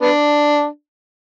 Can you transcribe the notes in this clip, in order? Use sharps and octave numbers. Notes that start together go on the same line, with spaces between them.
B3 D4